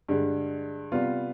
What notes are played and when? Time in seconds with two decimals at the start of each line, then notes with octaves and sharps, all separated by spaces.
0.09 G2 D3 G#3
0.92 C3 G3 B3 F4